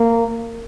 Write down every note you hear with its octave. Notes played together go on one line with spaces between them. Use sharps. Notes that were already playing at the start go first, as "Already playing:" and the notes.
Already playing: A#3